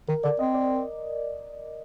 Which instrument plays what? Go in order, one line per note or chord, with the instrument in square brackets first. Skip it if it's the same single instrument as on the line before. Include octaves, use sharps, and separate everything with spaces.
[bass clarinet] D#3 [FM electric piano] A#4
[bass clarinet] D3 [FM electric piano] D5
[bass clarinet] C4 [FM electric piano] D#5
[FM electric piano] D5